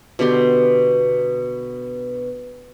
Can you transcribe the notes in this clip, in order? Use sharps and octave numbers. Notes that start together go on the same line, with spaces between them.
B2 D3 G4 C6